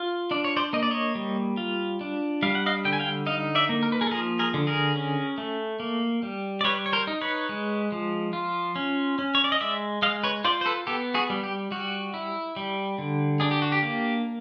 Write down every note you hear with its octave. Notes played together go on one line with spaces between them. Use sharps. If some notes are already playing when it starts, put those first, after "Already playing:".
Already playing: F4
D4 D5
C#5
C5 D5
A#3 D#5
D5
C#5 D#5
G3
F4
D4
G3 F5
F#5
D#5 F5
D3 G5
G#5
F5 G5
D#4 D#5 F5
D5 E5
A#3
A#4
B4
G#4 A#4
A4
F3 G#4 A#4
G#4 A#4
D3
G#4 A#4
C#4
A3
A#3
G3
D5
G3 B4 C#5
C#5
A#4 C5
D#4
B4 C#5
G#3
F3
F4
C#4
C#4
C#5
D5
D#5
G#3 D5 E5
G#3 D#5 F5
B4 C#5
F4 C5 D5
C5
A4 B4
B3 G4 A4
F#4 G#4
G3
G4
G3 F#4
E4
G3
D3
D4 G#4
G4
F#4
G4
A#3